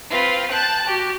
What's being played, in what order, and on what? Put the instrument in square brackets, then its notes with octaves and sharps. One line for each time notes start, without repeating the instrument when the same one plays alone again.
[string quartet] C4 F4 B4 F5
G5 A5 F#6 A6
F#4 G4